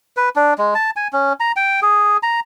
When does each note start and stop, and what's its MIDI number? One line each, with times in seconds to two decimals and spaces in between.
0.17 0.29 71
0.36 0.54 62
0.58 0.74 56
0.75 0.90 81
0.96 1.08 80
1.13 1.33 61
1.40 1.52 82
1.56 1.80 79
1.82 2.17 68
2.23 2.40 82